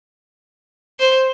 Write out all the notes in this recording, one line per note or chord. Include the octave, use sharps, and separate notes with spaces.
C5